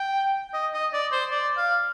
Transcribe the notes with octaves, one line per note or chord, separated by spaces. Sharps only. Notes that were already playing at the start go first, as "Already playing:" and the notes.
Already playing: G5
D#5
D#5
D5
C5
D5
F5